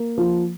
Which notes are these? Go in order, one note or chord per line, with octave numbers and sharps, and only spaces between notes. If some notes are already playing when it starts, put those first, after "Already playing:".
Already playing: A#3
F3